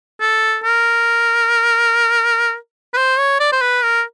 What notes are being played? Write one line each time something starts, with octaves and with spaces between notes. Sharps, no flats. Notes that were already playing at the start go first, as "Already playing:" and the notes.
A4
A#4
B4
C5
C#5
D5
C5
B4
A#4